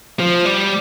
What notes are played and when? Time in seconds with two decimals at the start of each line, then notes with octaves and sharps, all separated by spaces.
0.20 F3
0.45 G3